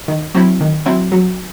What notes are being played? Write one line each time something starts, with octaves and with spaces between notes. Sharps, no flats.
D#3
F#3 C4 E4
D#3
F#3 C4 E4
F#3